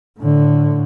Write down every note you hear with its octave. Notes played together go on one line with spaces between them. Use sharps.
A2 D3